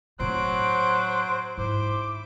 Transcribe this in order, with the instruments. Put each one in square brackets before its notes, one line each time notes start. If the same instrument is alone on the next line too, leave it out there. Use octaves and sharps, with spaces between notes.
[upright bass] A2 C4 [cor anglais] F#3 [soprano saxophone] C5 [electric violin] F#6 D7
[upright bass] G#2 [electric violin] E4 D6 [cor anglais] C5